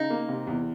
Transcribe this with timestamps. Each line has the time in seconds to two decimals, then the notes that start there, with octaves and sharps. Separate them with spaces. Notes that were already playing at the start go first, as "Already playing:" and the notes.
Already playing: C#3 D#4
0.10 A#3
0.29 C3
0.47 E2